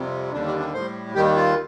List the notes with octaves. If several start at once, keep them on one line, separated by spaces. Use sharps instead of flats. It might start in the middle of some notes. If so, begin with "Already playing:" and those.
Already playing: F2 C3 G3
D#2 D3 G3 D4
D4
D4
A2 G3 C5
D#2 D#3 G3 G4
F4